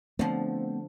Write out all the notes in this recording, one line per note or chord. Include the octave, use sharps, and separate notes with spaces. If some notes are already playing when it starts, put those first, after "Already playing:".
D3 F3 A3 B3 C4